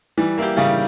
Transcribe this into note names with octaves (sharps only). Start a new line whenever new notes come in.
E3 G3
A#3 E4 G4
C#3 G3